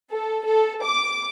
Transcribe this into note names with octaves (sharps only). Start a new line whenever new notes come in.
A4
A4
D6